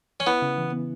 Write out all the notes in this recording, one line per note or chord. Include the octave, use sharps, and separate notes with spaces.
C#4
B3 E4
C#3
E3
B3